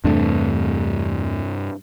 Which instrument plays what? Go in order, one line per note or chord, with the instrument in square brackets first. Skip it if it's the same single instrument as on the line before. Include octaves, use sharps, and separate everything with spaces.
[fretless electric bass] E2 A3 [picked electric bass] G2 C3 D4